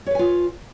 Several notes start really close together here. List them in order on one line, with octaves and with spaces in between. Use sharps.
C#5 B4 G#5 F4